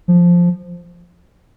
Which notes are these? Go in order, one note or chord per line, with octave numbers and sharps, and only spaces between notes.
F3